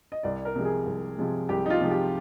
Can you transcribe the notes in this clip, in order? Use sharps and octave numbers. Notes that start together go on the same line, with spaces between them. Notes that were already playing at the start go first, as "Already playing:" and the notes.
D#5
C2 D5
A#4
C3 F3 G#3
G#4
C2
C3 F3 G#3
C2 G4
D#4
F4
C3 F3 G#3
G4